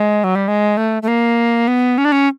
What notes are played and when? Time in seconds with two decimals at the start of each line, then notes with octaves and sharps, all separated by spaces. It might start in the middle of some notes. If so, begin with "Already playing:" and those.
Already playing: G#3
0.24 F#3
0.35 G3
0.48 G#3
0.77 A3
1.02 A3
1.08 A#3
1.68 B3
1.98 C#4
2.05 D4
2.12 C#4